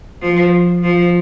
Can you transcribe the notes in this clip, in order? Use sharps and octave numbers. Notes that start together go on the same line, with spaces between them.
F3
F3